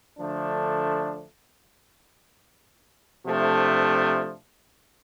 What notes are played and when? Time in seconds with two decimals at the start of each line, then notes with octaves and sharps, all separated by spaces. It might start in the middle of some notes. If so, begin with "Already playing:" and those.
0.18 D3 F3 A3 D4
3.26 C3 F3 A3 D4